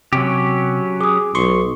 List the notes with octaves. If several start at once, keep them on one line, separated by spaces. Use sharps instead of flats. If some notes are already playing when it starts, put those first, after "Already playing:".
C3 F#3 C#4 G4
G#4 D6 D#6
B1 C6 C#6